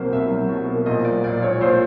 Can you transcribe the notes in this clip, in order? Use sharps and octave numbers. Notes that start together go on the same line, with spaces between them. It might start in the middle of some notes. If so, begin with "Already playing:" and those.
Already playing: C2 B2 F#3 A#3 C5
C2 E5
F#3
B2
A#3
A#1 D#5
F#3 D5
A#2 D5
A#1 C#5
A#1 C5